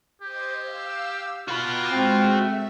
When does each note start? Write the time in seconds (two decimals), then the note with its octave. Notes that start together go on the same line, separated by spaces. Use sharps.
0.22 G4 C5 D#5 G#6
0.61 F5 E6
1.48 F4 F#4 G5 A#5 B5 D6
1.91 G#3 C4
2.30 A3 E5